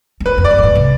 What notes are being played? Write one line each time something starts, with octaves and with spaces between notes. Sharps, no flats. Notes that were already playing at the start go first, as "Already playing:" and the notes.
E2
F2 B4
F2
D5
F2
G2
A2
C3